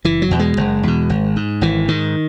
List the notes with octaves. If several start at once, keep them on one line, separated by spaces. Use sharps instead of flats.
F#1 E3
F#3
E2 B2
G#3
F#1
E2 B2
G#1
G#2
G#1 E3
G#2 D#3